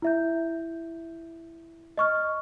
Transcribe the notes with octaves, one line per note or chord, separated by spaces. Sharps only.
E4 E5 G6
D#5 C#6 F6